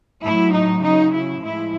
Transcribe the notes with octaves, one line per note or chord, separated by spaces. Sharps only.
A2 F#3 E4
D#4
C#3 F#3 D#4
E4
A2 F3 G#3 E4